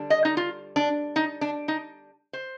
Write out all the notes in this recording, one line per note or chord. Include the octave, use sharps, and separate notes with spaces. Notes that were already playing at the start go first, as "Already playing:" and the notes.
Already playing: D3 G3 D4
D#5
D#4
F4
D4
D#4
D4
D#4
C5